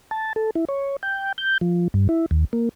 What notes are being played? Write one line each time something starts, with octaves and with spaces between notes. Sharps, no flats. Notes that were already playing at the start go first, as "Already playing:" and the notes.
A5
A4
E4
C#5
G5
G6
F3
G2
E4
D#2
A#3